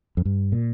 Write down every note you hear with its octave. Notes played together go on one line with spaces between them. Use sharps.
F2
G2
A#2